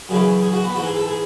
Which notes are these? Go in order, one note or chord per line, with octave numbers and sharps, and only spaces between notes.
F#2 C#3 E3 G#4
G#4
F#4
B3
G#2 E3 F#4
G#4
A4
G#4